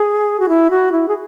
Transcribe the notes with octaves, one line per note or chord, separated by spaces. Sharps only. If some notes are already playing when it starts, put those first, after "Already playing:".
Already playing: G#4
F#4
E4
F#4
E4
G#4